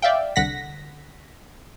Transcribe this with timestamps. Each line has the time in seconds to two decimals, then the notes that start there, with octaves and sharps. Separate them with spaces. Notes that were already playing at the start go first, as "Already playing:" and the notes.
0.02 D5 E5 F5 G5
0.36 C2 D3 F#5 A#6 B6